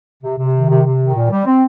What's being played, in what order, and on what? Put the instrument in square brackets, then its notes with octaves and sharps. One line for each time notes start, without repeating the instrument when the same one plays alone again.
[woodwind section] C3
C3
D#3
C3
C3
D#3
A#2
G3
C4